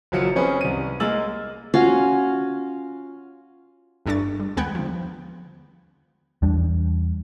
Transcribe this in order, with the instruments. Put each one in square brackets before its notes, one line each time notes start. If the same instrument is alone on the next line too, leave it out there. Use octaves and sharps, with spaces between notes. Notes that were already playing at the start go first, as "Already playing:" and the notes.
[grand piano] F#1 F3 F#3 F4 C#7
C4 C#4 G#4 B4
C2 D#7
G#3 A#3 E6 A6 F#7
[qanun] C#4 F4 F#4 F5
[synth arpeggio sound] G1 G2 A3 D4 C#6 A6
G3
D#2 G#3 B3 G5 F#6 G#6
D3 F3
[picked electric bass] E2 G3 D4